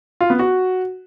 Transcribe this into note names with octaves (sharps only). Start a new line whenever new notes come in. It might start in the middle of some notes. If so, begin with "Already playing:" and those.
F4
B3
F#4